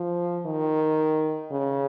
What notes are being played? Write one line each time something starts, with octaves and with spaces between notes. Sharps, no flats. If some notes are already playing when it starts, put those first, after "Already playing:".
Already playing: F3
D#3
C#3